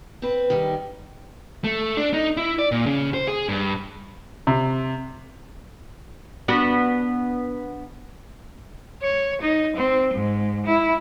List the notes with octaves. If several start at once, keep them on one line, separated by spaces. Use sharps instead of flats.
C4 B4
D#3 G3
A3
D4
D#4
E4
D5
A#2
C#3
C5
G#4
G2
C3
B3 D4 F#4
C#5
D#4
C4
G#2
E4